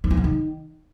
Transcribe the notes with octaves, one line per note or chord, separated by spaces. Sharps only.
D#3
E3
D3
D#3